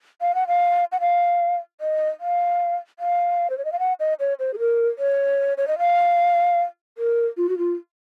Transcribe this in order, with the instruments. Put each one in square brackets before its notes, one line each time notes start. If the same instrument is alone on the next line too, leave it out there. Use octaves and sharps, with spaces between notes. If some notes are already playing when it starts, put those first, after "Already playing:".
[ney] F5
F#5
F5
F#5
F5
D#5
F5
F5
C5
C#5
D#5
F5
F#5
D#5
C#5
C5
G#4
A#4
C#5
C#5
D#5
F5
A#4
F4
F#4
F4